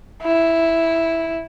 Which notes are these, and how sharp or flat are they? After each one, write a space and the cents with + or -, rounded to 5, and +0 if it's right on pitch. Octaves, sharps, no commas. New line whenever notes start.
E4 +0